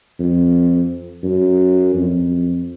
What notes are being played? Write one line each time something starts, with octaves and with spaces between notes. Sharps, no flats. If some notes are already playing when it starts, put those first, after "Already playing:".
F2
F#2
F2